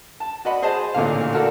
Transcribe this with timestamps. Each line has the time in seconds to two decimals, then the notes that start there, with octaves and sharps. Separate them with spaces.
0.20 A5
0.45 F#4 D5 D#5 F#5 B5
0.62 G#4 C5 D#5 A5
0.94 A1 A#2 D3 F5
1.33 F#4 A4 A#4 D5